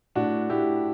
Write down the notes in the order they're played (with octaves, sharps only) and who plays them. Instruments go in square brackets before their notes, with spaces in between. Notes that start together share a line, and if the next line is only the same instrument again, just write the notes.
[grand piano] A2 D4 F#4
A2 E4 G4